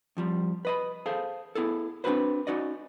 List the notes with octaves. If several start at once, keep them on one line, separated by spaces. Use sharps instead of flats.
F2 F3 G3
B4 D#5 B5
G#4 A4 C5 F5
B3 E4 G#4 A4
C4 D4 F4 F#4 B4 C5
C#4 D#4 F#4 D5 D#5